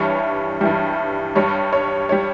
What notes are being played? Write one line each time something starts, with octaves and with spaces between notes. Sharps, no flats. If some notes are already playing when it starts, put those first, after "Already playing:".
Already playing: G2 E3 G3 C#5
G2 E3 G3
G2 G3 C#5
C#5
G3 C#5